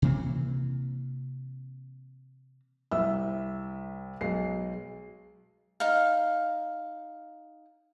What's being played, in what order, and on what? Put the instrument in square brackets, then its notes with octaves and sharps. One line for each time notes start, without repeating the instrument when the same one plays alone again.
[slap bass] C3 E3 A#3 C4
[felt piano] C2 E5 E6
B1 G#3 C7
[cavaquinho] D#4 F5